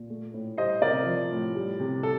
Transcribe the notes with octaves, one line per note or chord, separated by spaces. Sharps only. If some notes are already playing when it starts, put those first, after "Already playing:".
Already playing: A#2
A3
A2
G3 C5 D#5
C3 A#4 D5
F3
A2
G3
C3
A4